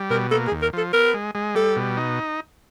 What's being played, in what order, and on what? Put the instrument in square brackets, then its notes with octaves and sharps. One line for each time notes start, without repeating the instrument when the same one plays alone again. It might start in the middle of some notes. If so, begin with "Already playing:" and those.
Already playing: [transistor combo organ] G3
[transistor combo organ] B2 [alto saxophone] A#4
[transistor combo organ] A#3 [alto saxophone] A4
[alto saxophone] G#4
[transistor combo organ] D#2
[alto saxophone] A#4
[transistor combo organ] F3 [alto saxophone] A4
[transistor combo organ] B3 [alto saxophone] A#4
[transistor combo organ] G#3
G#3
[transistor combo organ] G3 [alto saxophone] A4
[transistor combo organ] B2
D#4